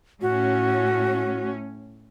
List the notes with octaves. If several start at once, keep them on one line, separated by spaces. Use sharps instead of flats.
A2 C#4 F#4